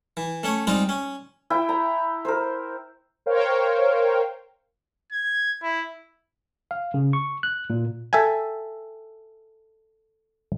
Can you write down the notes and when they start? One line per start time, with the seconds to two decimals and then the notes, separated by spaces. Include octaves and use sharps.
0.17 E3
0.43 A3 C#4 C#5
0.67 G3 G#3 C4 D#4 F4
0.89 C#4
1.50 E4 G5
1.69 A#5
2.25 A#4 C5
3.26 A#4 C5 C#5 F5 G5
5.12 G#6
5.63 E4
6.71 F5
6.94 C#3
7.13 C#6
7.43 F#6
7.70 A#2
8.13 A4 E5 G5 G#5